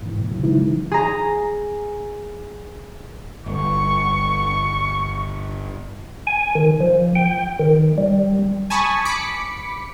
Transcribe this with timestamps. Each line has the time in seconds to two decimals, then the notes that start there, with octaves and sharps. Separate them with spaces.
0.02 G#2 E3
0.19 A#2
0.30 C#3 E3 F#3
0.43 C#3 E3 F#3 G#3 D#4 E4
0.57 E3
0.92 G#4 A#5
3.46 G1 C#6
6.27 G#5
6.55 D#3
6.80 F3
7.15 G5
7.59 D#3
7.98 G3
8.70 G#5 A5 B5 C#6 D#6
9.05 B5 D6 B6 C#7